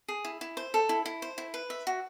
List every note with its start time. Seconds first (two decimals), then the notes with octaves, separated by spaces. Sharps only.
0.08 G#4
0.25 E4
0.41 E4
0.57 C5
0.74 A4
0.89 E4
1.06 E4
1.22 C5
1.38 E4
1.54 B4
1.70 E5
1.87 F#4